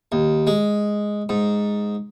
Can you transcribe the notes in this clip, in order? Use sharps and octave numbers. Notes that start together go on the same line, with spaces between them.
D#2
G#3
G#2